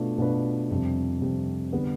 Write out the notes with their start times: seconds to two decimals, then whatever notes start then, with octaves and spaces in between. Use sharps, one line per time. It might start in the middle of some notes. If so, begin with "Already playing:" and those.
Already playing: B2 A3 D4 F4 B4
0.18 B2 A3 D4 F4 B4
0.70 F2 C3 G3
1.21 F2 C3 G3
1.73 D3 G3 B3